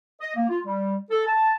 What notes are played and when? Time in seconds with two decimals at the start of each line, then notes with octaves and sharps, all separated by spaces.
0.21 D#5
0.36 A#3
0.49 F4
0.65 G3
1.11 A4
1.27 A5